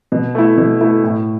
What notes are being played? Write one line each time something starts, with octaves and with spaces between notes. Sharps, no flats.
B2
A3 E4
B2
A3 E4
A2